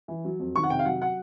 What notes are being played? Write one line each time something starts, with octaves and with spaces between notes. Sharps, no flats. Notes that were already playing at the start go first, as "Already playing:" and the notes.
E3
F#3
F2
D#3 C#6
F#5
C3 G5
F5
F#3 F#5
F#5